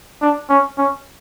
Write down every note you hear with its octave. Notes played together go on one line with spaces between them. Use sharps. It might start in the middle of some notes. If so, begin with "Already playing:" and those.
D4
C#4
C#4